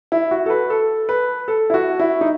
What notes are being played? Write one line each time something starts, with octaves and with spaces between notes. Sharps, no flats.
E4
F#4
A4
B4
A4
B4
A4
E4
F#4
E4
D#4